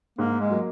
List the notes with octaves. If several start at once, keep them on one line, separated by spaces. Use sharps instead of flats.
G#2 A#3
G#3
F#3 A#3